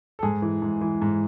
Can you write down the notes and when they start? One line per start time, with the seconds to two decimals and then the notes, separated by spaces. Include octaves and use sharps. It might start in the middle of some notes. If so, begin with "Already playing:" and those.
0.19 A4
0.23 G#2 G#4
0.42 E3
0.62 G#2
0.81 E3
1.02 G#2